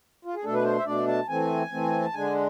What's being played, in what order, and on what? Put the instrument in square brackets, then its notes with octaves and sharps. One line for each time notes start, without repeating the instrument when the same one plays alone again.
[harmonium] F4
G#4
B2 A3 D4 A4
B4
C5
E5
B2 A3 D4 D5
A5
E3 A3 C4 G#5
E3 A3 C4
A5
D3 G#3 D4 G#5